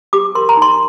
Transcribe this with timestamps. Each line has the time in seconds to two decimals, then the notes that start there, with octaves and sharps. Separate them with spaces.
0.13 G4 D6
0.35 A#4 C6
0.49 A#5
0.57 D#4 C6